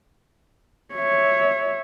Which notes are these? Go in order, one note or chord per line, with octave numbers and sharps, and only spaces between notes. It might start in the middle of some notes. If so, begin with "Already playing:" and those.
C#5 E5